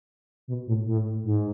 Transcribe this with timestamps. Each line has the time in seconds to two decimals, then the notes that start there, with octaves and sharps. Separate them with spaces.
0.48 B2
0.67 A2
0.86 A2
1.24 G#2